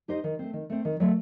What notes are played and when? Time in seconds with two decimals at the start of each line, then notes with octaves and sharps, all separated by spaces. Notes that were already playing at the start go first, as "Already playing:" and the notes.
0.08 D#4 G4 C5 D#5
0.24 D#3
0.39 A3 C4
0.53 D#3
0.70 A3 C4
0.85 D#3
1.00 F#3 A3